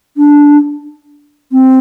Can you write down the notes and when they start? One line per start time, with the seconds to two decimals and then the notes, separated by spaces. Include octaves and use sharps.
0.17 D4
1.52 C4